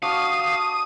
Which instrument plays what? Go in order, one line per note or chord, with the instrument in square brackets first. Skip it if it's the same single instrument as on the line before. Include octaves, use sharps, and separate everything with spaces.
[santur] D4 F#4 [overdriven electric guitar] F5 [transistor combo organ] D#6